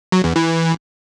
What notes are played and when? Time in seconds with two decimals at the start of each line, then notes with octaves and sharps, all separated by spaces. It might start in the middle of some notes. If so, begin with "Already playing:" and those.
0.12 F#3
0.24 E2
0.36 E3